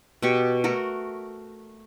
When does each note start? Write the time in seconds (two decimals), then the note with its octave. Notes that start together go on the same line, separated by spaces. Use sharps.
0.22 B2 F#4 G4 C#6
0.64 A3 F#4 A#4